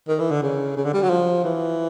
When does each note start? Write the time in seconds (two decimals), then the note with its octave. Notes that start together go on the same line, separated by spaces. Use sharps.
0.08 D#3
0.20 E3
0.31 D3
0.43 C#3
0.77 C#3
0.85 D3
0.94 G3
1.02 F#3
1.10 F3
1.44 E3